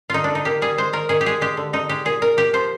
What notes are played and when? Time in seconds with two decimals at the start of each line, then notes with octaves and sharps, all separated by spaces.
0.10 D3 D#4 F4
0.24 D4
0.30 D3 D#4
0.45 A#3 G4
0.62 G3 G#4
0.78 G#3 C5
0.93 D#3 A#4
1.09 D#3 G#4
1.21 G4
1.26 G#3 G#4
1.41 G#3 G4
1.57 D3
1.73 D3 D#4
1.89 G#3 G4
2.05 A#2 G#4
2.22 A#2 A#4
2.37 A#3 G4
2.53 F3 C5